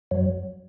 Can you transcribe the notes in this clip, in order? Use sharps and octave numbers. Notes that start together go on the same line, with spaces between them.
F#2 F#3